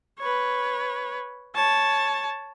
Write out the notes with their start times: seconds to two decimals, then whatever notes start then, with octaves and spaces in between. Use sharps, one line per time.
0.19 B4 C#5
1.55 C#5 A5